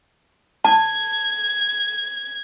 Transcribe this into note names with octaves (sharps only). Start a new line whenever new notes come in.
A5 G#6